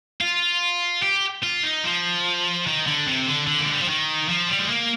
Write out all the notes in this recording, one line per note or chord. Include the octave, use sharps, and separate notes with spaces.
F4
G4
F4
D#4
F3
D#3
D3
C3
D3
D3
A#3
G#3
G3
F3
D#3
F3
G3
G#3
A#3